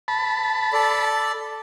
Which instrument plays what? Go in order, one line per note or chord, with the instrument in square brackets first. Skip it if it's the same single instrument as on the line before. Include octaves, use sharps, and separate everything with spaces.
[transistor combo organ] A5 B5
[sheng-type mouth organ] A4 D5